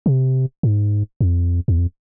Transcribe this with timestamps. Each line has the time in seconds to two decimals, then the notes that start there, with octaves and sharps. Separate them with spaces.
0.06 C3
0.63 G#2
1.21 F2
1.68 E2
1.78 F2